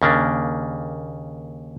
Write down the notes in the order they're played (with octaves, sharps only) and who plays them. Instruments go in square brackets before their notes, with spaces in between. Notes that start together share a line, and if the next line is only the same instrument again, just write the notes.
[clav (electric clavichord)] D#2 C#3 A#3 D4